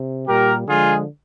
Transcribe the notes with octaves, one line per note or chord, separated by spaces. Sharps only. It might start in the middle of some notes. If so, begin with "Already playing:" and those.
Already playing: C3
A#2 G3 G4 A#4
D3 F3 G#3 F4 G#4